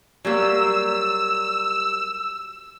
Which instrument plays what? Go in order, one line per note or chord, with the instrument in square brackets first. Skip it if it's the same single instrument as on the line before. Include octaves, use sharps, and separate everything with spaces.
[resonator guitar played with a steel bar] F#3 G3 A#3 [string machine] E6